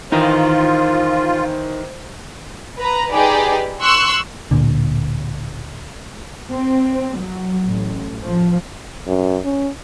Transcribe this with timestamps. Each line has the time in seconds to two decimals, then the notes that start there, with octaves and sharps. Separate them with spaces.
0.12 D#3 E3 D#4 F4 A#4 C5
2.79 B4 A#5
3.12 D#4 G4 G#4 B4 D5
3.81 C6 C#6 E6 F#6
4.51 D1 C2 A#2 D3
6.51 C4
7.17 F#3
7.66 A1
8.25 F3
9.07 F#2
9.45 C#4